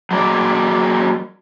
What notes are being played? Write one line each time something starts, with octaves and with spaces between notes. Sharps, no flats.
F#3 G#3 A#3 D5